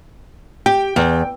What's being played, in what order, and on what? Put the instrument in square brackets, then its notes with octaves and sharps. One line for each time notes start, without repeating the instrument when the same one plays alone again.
[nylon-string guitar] G4 [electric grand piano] G5
[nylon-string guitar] E2